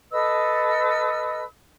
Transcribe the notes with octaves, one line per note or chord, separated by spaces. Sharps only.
A4 B4 D#5 E6